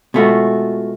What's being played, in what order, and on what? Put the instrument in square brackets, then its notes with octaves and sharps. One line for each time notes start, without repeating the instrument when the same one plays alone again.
[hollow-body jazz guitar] B2 G#3 A3 B3 F4 F#4